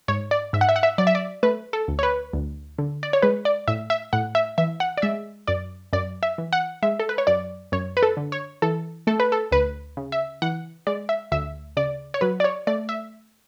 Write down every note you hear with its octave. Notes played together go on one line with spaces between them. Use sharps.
G#2 C#5
D5
G#2 E5
F#5
E5
F#5
E5
F#3 D5
E5
D5
A3 B4
A4
D2
C#5
B4
D2
D3
D5
C#5
G#3 B4
D5
A2 E5
E5
A2 F#5
E5
E3 E5
F#5
D5
G#3 E5
F#2 D5
F#2 D5
E5
E3
F#5
G#3 E5
A4
B4
C#5
F#2 D5
F#2 C#5
B4
A4
D3
C#5
E3 A4
A3 A4
B4
A4
D2 B4
C#3
E5
E3 F#5
G#3 D5
E5
D2 E5
C#3 D5
C#5
F#3 B4
D5
C#5
A3 D5
E5